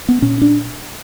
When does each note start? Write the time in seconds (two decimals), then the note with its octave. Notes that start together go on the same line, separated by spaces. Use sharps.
0.09 B3
0.22 A#2 C#4
0.42 D4